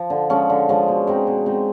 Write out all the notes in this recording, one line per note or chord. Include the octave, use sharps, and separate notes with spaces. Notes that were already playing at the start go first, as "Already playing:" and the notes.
Already playing: F3
D3
F3 G#3 C#4
D3
F3 G#3 C#4
B2
G#3 C4 D#4
B2
G#3 C4 D#4